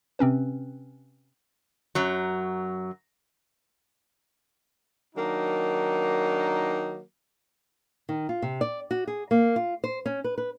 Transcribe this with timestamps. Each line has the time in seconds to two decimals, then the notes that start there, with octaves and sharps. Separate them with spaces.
0.19 C3 C4 C#4 B4
1.95 F#2 F#3
5.15 D#3 F#3 A#3 D4 D#4
8.09 D#3
8.29 F4
8.42 C3
8.61 D5
8.91 F#4
9.07 G#4
9.31 A#3
9.56 F4
9.84 C5
10.06 C#4
10.24 B4
10.38 B4